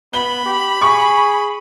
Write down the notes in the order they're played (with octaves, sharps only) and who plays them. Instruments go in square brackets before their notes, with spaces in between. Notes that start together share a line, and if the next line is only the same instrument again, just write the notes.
[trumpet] B3 [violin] B5 [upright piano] G7
[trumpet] G4
[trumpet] G#4 [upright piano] C#6